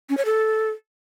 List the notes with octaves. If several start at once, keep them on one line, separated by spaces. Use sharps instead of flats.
C#4
C#5
A4